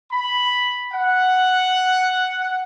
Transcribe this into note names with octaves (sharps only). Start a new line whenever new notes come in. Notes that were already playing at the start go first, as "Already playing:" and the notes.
B5
F#5